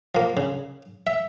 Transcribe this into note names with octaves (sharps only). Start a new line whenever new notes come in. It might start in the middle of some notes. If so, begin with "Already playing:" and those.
F3 A#3
C#3
E5